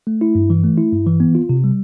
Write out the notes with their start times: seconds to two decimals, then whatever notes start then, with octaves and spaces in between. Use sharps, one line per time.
0.07 A3
0.21 E4
0.35 G2
0.50 E3
0.64 A3
0.77 E4
0.92 G2
1.07 E3
1.20 B3
1.35 F4
1.49 C3
1.64 G3